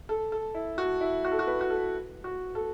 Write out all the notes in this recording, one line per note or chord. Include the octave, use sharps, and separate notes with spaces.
A4
A4
E4
F#4
E4
F#4
A4
F#4
B4
F#4
A4
F#4
A4